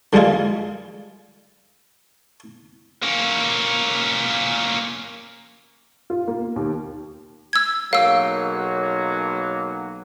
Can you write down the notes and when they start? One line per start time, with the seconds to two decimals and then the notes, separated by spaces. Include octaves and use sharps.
0.13 D3 G3 G#3 F4 G#4
3.03 A#3 C#4
6.10 F4
6.28 A#3
6.56 D#2
7.53 E6 G#6
7.93 B1 F#3 A#3 G#4 A#4 C#5 F5 E6